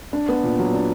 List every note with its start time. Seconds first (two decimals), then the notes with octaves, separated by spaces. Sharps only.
0.13 D4
0.29 B3
0.43 A#2
0.59 F#3
0.74 D4